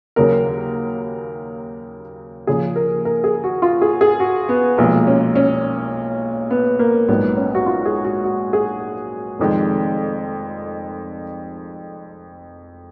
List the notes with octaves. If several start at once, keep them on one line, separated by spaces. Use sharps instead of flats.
D#2 C#3 F#3 A#4
D#2 C#3 F3 G#4
A#4
A#4
G#4
F#4
F4
G#4
G#4
F#4
B3
B1 A#2 F3 G#3
C#4
C#4
B3
A#3
A#1 G#2 F#3 B3
C#4
F#4
F4
G#4
F#4
F#4
G#4
F1 F2 D#3 G#3